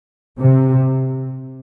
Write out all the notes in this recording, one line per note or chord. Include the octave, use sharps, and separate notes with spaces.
C3